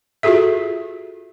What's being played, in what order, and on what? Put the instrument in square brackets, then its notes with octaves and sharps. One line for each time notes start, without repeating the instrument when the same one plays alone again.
[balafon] F4 F#4 G#4 A4 E5